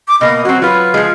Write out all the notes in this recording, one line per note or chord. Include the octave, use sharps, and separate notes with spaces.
D6
B2 A#3 D#5
F#3 C4 F#4
F#3 F4 B4
F3 G#3